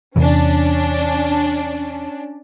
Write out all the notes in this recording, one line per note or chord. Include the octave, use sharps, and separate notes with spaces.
E2 C3 E3 C#4 D4